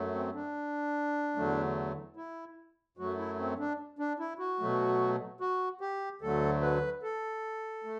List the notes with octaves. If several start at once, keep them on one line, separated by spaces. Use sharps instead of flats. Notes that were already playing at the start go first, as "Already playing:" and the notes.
Already playing: F#2 F#3 A3
C4
D4
E2 D3 F#3 A3
E4
F#2 F#3 A3 F#4
E4
C4
D4
D4
E4
F#4
B2 F#3 A3
F#4
G4
D2 D3 F#3 A3 A4
B4
A4
A3